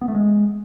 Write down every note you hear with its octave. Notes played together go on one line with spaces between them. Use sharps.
B3
A3
G#3